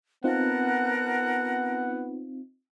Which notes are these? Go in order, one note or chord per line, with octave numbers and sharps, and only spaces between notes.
B3 C4 D#4 F4 A#4 F#5 A5 F#6